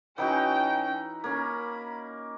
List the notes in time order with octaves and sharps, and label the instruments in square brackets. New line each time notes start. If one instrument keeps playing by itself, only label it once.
[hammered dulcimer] E3 D#4 F#4 [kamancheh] C#4 G5
[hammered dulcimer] A#3 C#4 [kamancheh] B5